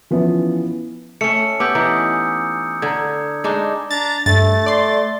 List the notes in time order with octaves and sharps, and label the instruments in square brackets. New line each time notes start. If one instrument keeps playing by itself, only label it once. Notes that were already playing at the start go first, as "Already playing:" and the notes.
[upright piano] E3 F3 B3 C#4 E4
[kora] A3 C#4 [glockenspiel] C#7
[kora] B3 G4 [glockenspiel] D6 E6 G6
[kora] E3 D#4 [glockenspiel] A#5 D#6
[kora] D3 [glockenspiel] A#5 G#6
[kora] G#3 D4 D#4
[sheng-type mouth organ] D4 A#5 [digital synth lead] A6
[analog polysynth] G2 [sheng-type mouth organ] A3 [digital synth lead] A6
[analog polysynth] D5 C6